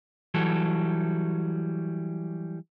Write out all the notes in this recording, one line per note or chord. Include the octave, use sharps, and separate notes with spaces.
E3 F#3 G3 A4